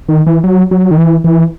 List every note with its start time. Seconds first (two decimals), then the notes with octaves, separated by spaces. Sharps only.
0.09 D#3
0.27 E3
0.44 F#3
0.71 F#3
0.91 D#3
0.98 E3
1.24 E3